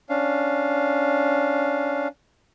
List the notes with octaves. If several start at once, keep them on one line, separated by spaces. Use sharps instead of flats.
C#4 D4 F5